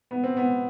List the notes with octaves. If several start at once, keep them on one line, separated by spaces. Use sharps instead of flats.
B3
C4
B3